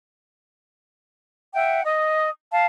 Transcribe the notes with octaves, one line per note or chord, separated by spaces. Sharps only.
E5 F#5 G5
D#5 D#6
F5 A5